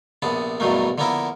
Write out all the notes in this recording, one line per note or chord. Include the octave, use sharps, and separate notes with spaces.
A#1 C3 B3 A5
E2 G2 B2 F#3 A3 A#3
D3 F3 A#3 B3 E4 A#4